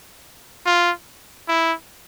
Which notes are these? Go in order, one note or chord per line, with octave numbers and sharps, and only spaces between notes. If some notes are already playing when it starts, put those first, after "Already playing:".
F4
E4